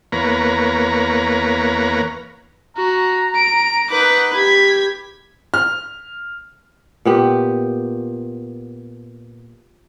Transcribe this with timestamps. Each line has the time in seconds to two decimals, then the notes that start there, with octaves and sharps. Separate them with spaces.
0.12 E2 A#3 B4 C#5 A#5
2.77 F#4 A#5
3.35 D7
3.90 D#4 B4 F#5 D6
4.35 G4 B5 G#6 B6
5.54 F6
7.05 A#2 B3 G4